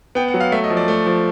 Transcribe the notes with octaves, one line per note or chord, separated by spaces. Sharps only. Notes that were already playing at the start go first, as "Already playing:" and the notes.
B3 G5
F#5
F#3
F5
A3 E5
D#5
F3
D5
A3
F3